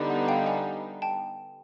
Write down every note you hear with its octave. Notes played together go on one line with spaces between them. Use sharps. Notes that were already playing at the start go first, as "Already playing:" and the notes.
Already playing: D3 G3 B3 D#4
F#5
F5 G5
F#5 G#5
G5 A5